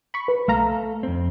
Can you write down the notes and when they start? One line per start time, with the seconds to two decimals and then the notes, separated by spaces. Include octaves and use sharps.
0.14 B5 C#6
0.28 B4
0.48 B1 A3 A4 F5 A#5
1.03 F2 C4